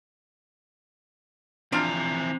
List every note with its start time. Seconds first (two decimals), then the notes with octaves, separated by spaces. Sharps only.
1.72 E3 F3 C4 D4 F4 F5 A#5